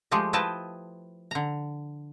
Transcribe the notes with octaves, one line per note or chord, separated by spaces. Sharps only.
F3 G#3 A3 G4 D#5
F3 E4 B4 D#5 G5 A5
D3 A#5